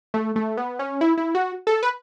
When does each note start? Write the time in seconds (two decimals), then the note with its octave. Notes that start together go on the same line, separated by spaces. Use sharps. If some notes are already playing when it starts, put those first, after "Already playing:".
0.14 A3
0.36 A3
0.57 B3
0.79 C#4
1.01 E4
1.18 E4
1.35 F#4
1.67 A4
1.83 B4